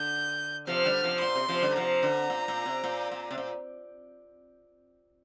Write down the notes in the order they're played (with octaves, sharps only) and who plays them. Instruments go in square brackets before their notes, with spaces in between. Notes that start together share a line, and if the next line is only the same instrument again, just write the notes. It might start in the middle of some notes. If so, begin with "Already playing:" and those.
Already playing: [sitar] D3 [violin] G6
[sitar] C3 F3 [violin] F6
[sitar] D3 G3
C3 F3
[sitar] A#2 [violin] C6
[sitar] C3
C3 F3
D3 G3
[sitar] C3 F3 [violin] A#5
[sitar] D3
A#2
A#2
C3
A#2
A#2
C3
A#2